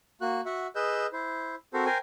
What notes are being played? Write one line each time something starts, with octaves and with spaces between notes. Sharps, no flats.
A#3 F#4 F#6
F#4 E5 F#5
G#4 B4 D#5 E6 G6
E4 C5
C4 F#4 A4 A#4 C5
A#4 C5 G5 G#5